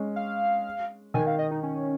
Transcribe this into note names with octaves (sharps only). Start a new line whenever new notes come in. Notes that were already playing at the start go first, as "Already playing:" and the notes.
Already playing: G#3 C#4
F5
D#3 G#5
F5
D#5
D#4
C#4